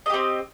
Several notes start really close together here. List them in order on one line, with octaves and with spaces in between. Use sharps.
D#5 G4 C4